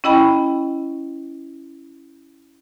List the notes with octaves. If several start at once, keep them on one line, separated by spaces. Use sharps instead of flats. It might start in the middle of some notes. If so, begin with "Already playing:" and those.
C#4 E4 D#5 G5 B5